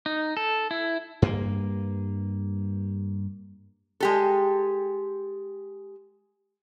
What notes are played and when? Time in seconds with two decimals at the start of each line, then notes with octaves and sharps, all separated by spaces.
0.06 D#4
0.37 A4
0.71 E4
1.22 G2 A#3
4.00 G#3 G4 A4